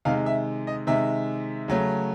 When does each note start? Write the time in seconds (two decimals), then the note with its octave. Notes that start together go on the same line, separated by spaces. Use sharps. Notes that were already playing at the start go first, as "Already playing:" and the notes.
0.05 C3 D#3 G#3 F5
0.26 E5
0.67 D#5
0.87 C3 D#3 G#3 E5
1.68 C#3 F#3 A3